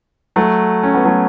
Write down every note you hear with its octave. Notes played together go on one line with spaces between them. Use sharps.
F#3 A3
C#4
B3
F#3 A3